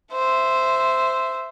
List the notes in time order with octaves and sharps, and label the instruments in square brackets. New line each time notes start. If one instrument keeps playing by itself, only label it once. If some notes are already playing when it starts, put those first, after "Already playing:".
[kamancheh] C5 E5